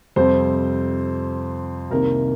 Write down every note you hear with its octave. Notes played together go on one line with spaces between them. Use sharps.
F2 C3 G3 C4 C5
C2 C3 D#3 A#3 A#4